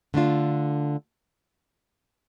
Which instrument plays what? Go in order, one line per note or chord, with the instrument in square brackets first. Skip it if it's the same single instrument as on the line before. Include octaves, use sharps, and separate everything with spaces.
[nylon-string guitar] D3 A3 D4 F4